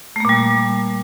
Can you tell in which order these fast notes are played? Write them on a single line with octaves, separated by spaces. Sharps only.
A3 A#3 A#2 G3